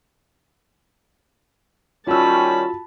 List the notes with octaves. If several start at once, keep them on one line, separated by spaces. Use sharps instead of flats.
D#3 G3 C#4 F4 F#4 A5 B5 E6